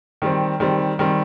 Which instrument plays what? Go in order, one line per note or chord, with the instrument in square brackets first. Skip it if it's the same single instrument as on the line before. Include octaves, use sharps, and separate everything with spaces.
[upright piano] D#3 G3 C4
D#3 G3 C4
D#3 G3 C4